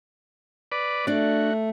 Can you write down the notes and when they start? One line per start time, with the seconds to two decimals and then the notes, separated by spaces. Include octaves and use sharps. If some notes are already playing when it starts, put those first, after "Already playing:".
0.72 B4 D5
1.07 A3 D4 F#4 D5